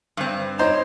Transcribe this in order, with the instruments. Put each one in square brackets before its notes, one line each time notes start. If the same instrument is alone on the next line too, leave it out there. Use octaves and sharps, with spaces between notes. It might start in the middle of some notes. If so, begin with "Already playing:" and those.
[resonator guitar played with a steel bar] G2 C4
[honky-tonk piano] D#4 [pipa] C5 [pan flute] C#5